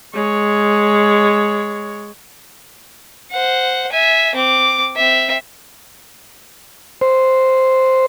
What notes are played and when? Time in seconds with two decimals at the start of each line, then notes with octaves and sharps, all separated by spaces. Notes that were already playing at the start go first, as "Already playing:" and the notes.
0.14 G#3 C#5
3.32 C5 F#5
3.92 E5 G#5
4.35 C4 D6
4.96 C4 E5
7.01 C5